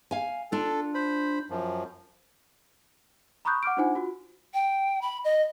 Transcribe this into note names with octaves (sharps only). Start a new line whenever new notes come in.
F5 G#5
D4 F4 A4
C5 B5
F#2 F3
A#5 B5 C#6 D#6 F#6 G6
F#5 D6 F6 D7
D4 D#4 F4 C5 F#5 G#5
F4 F#4
G5
B5
D#5